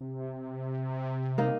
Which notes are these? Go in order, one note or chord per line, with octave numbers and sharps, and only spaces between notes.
C3
A#3 D#4